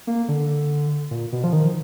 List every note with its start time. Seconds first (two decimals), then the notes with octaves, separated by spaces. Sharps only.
0.07 A#3
0.28 D3
1.11 A#2
1.32 B2
1.44 F3
1.53 D#3